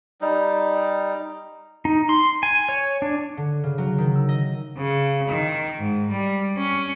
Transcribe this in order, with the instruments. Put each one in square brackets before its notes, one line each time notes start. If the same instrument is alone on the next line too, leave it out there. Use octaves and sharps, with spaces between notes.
[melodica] G3 D#4
[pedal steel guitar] D#4
C6
G#5
C#5
D4
[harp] D3
C#3
F#3
D#3
E6
D#5
[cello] C#3
D#3
G#2
G3
C#4